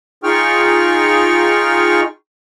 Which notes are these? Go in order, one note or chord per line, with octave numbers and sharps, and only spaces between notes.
D#4 F4 G#4 G5 C#6 F6